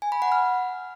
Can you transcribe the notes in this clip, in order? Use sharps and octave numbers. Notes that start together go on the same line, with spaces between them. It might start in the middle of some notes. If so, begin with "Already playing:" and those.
G#5
B5
F#5
F6